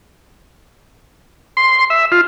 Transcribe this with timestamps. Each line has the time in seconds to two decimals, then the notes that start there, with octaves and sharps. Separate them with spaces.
1.57 C6
1.90 E5
2.12 F4